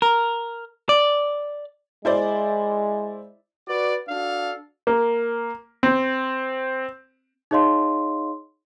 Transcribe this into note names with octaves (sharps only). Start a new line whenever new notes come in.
A#4
D5
G#3 E4 C5 D5
F#4 B4 D5
D4 F#4 A4 F5
A#3
C4
D#4 G#4 C#5 D#5 F5 C6